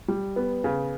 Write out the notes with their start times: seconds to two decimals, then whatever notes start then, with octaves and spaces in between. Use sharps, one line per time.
0.08 G3
0.36 B3
0.64 C#3